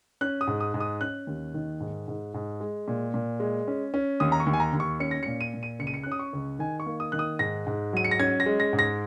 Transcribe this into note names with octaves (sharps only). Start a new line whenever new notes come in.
C#4 F#6
D#6
G#2
D#6
G#2
D#6
C#4 F#6
D#2
D#3
G#2
G#2
G#2
G#3
A#2
A#2
G#3
C#4
C#4
D#2 D#6
A#5
C#6
D#2
G#5
A#5
D#2
C#6
C#4 C#7
A#6
A#2 C#7
D#7
A#2
D#7
C#2 C#7
D#7
C#7
F#6
C#4 D#6
C#6
C#2
D#3 G#5
C#6
A#3
D#6
D#3 F#6
D#6
G#2 A#6
G#2
F#3 D#7
C#7
A#6
C#4 G#6
A#6
G#3
A#6
G#2
A#6